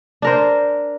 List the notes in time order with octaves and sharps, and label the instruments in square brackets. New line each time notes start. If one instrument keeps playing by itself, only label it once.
[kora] D4 A#4 C5